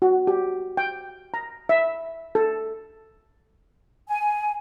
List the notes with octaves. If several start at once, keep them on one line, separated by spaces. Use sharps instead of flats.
F#4
G4
G5
A#5
E5
A4
G#5